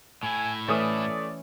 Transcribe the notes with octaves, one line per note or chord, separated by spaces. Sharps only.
A2 E4 G#5
E3 A3 C#4 D5 D#6